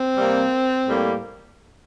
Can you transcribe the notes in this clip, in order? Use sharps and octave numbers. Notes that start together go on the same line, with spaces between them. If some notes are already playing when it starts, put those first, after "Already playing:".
Already playing: C4
C3 G3 A#3
A2 G3 A#3